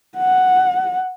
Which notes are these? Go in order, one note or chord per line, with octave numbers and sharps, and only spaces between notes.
F#5